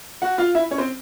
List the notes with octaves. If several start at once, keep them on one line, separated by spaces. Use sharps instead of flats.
F#4 F#5
F4 F5
E4 E5
C#4 C#5
C4 C5